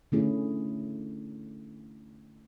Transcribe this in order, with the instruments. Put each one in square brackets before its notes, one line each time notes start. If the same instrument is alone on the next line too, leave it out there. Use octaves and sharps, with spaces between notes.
[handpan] D3 A3 C#4 E4 G#4